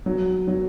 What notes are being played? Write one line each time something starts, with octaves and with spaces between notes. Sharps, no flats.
F#3
F#3